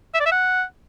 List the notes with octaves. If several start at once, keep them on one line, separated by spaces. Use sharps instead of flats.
E5
D5
E5
F#5